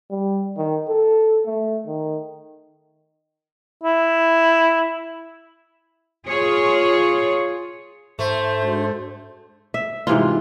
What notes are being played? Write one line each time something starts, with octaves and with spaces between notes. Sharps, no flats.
G3
D#3
A4
A3
D#3
E4
F4 G#4 C#5
G#2 A3 C5
G#3 D4 F#4
E5
G#2 C3 E3 F4